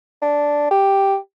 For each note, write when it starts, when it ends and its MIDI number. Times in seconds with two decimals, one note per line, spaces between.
0.22 0.67 62
0.71 1.16 67